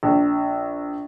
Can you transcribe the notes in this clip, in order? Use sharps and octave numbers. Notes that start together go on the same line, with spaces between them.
A#1